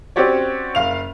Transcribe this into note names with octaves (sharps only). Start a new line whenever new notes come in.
C4 C#4 F#4 G4 C#5 D5
F#1 F5 F7